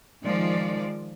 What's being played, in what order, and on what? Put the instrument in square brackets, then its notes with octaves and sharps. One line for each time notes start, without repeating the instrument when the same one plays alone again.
[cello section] D#3 F3 G#3 D5